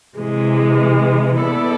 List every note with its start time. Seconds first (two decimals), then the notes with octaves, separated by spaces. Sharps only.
0.16 C3 E3 G#3
1.38 B3 E4 A4 D5